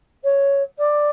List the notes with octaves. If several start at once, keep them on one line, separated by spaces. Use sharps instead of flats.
C#5
D5